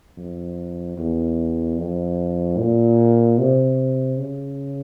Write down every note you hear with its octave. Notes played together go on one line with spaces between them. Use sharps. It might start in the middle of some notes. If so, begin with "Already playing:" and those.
F2
E2
F2
A#2
C3
C#3